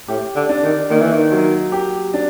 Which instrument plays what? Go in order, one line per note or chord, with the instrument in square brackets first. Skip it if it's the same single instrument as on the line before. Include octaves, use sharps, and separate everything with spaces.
[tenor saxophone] A2 [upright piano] G4
[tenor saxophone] D3
[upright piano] D4
[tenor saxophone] D#3
[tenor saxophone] D#3 [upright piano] A#3
[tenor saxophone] E3
D#3
[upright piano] F#3
G4
D4